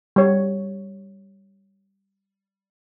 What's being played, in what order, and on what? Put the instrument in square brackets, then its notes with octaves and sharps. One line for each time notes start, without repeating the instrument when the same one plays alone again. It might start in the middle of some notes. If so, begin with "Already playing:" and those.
[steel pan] G3 C#5